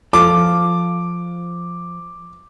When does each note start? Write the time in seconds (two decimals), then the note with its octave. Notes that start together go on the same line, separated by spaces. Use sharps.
0.13 F3 F4 A4 D6